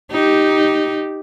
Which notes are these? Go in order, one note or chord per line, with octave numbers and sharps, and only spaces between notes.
D#4 G4